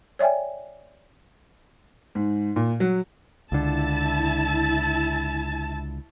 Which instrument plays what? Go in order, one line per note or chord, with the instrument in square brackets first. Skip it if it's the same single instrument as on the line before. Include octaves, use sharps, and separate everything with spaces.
[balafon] C#5 D5 E5 G5 G#5
[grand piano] G#2
A#2
F#3
[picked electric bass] C#2 D3 [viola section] E4 A5